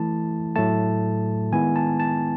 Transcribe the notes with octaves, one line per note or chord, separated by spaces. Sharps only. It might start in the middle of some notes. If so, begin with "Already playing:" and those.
Already playing: E3 A3 E4 A5
A2 F#3 A3 A5
D#3 G#3 B3 E4 G#5
A5
A5